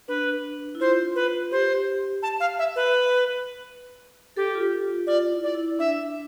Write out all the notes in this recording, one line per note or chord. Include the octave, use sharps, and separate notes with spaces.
D4 B4
E4
F4 C5
B4
G4 C5
A5
F5
E5
B4
G4 A4
F4
G4
F4
F4 D5
E4
D5
E4
D4 E5